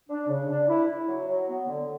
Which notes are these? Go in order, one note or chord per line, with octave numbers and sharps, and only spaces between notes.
D4
C#3
D4
E4
E4
F#3
F#3
B3
D3